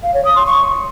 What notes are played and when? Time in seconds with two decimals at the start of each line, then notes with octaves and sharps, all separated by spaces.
0.03 F5
0.14 C#5
0.25 D#6
0.36 C6
0.47 C#6